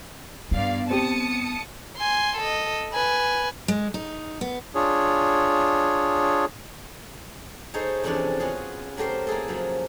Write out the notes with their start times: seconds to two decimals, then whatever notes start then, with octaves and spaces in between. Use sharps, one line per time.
0.51 G2 B3 D5 F5
0.90 C4 G4 A5 D#6 C#7
1.97 G#5 C6
2.37 A4 D#5
2.93 B4 G#5
3.68 G#3
3.94 D#4
4.41 B3
4.75 D4 F4 G#4 C#5
7.74 D#4 G#4 A4 C5 C#5
8.03 F2 C3 E3 C#4 D4 D5
8.40 B3 C#4 F4 F#4 G#4
8.97 F#3 A3 G4 A#4 C5
9.27 A#3 E4 G#4 A4
9.48 C#3 F3 F#3